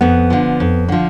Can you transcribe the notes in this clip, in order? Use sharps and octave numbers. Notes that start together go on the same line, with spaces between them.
F2 B3
D3 F3
F2
D3 F3